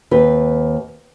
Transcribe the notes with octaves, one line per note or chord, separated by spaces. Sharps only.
D#2 C4 B4